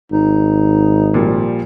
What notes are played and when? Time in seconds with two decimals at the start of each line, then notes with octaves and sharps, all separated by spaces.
0.12 G#1 D#4
1.14 A#2 F3 G3